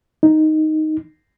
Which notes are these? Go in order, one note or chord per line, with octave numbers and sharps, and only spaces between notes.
D#4